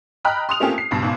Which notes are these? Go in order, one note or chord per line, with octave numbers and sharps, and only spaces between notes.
D#5 G5 A#5 B5 F6 F#6
C6 D#6 F7
A3 A#3 C4 C#4 F4 G4
C7
C#2 G2 B2
G#1 G#2 B2